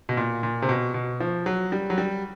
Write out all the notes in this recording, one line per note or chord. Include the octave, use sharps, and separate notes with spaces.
B2
A#2
A#2
C3
B2
B2
F3
F#3
G3
F#3
G3